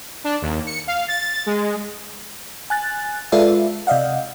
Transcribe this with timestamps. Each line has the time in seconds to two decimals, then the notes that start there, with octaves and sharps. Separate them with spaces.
0.24 D4
0.42 D#2
0.67 C#7
0.87 F5
1.08 A6
1.46 G#3
2.70 G#5 F#6 A6
3.32 G#3 F4 A4 B4 D5 E5
3.87 C3 D5 D#5 F5 F#5